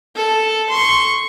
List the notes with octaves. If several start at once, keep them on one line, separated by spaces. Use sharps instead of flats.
A4
C6 C#6